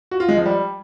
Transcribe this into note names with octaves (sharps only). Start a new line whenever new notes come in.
F#4
F4
G#3
F3
G3